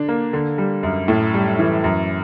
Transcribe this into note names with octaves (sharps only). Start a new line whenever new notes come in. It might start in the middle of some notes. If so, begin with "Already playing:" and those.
Already playing: D3 D4
A#3
D3
G3
F#2
A2
G3
E3
F#2